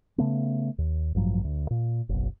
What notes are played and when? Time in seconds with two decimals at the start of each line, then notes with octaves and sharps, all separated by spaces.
0.18 C#3 A3 B3
0.78 D#2
1.15 A1 G2 F3 F#3
1.44 D2
1.71 A#2
2.09 F#1 B1